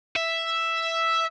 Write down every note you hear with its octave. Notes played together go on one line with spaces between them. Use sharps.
E5